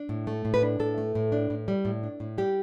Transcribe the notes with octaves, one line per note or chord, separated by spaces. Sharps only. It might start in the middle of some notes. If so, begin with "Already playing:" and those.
Already playing: D4
A2
A3
A2
B4
D4
A2 A4
A3
A2
D4
A2
G3
A2
D4
A2
G3 G4